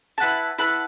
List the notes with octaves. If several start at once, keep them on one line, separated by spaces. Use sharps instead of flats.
E4 B4 F#5 A5
E4 B4 F#5 A5